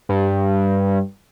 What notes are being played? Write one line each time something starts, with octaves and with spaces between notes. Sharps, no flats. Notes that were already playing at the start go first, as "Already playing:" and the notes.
G2